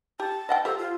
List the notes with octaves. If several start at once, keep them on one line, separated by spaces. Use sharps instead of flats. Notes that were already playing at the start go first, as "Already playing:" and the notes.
G4 A5
D#5 F#5 G5
F3 G4 A4
F4